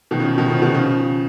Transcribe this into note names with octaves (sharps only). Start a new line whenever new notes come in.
B2 D#3
C#3 F3
B2 D#3
C#3 F3
B2 D#3
C#3 F3